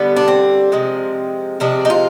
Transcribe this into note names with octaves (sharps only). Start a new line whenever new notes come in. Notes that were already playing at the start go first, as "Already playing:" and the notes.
Already playing: D3 G3 B3
D4
C4
C3 F3 G#3
C3 F3 G#3 D4
D#4
F4